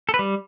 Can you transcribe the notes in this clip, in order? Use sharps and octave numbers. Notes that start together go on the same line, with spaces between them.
A4
B4
G3